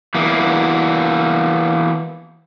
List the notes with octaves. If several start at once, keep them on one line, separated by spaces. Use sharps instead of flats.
E3 A#3 B3